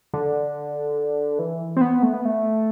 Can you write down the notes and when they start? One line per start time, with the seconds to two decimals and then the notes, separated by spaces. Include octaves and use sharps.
0.13 D3
1.39 E3
1.77 C4
1.81 B3
2.03 A3
2.14 B3
2.25 A3